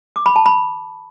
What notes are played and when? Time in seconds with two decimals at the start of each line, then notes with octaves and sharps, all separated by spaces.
0.16 D6
0.26 B5
0.36 A5
0.46 B5